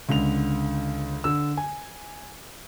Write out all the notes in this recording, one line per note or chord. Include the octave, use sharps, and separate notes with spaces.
C#2 D3 F7
D3 E6
G#5